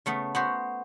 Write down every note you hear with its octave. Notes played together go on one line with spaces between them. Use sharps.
C#3 A3 B3
B3 F#4 C5